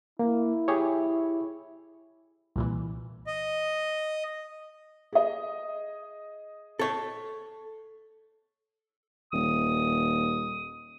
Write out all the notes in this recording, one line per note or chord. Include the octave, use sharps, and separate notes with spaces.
A#3 E4
G4 G#4 C#5
C2 A#2 E3
D#5
G#4 D#5
A4 C#5
D#1 D#6